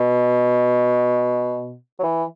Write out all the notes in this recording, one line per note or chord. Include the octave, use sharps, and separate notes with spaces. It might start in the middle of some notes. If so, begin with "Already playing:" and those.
Already playing: B2
F#3
E3